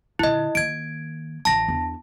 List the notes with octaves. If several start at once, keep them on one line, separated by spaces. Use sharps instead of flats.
A#2 D3 E4 D#5
D#3 A#3 G#6 D7
A1 E3 A5 A#6
E2 D4